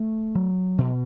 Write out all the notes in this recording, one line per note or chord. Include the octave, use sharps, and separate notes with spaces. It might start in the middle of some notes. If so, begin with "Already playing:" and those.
Already playing: A3
F#3
B2